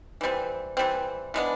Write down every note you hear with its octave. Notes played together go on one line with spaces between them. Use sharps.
E3 G3 C4
E3 G3 C4
E3 G#3 B3 D4